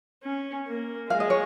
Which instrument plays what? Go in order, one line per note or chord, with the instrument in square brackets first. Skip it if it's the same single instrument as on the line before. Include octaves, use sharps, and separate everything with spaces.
[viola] C#4
A#3
[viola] G#3 [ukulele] F5
[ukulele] D#5
C#5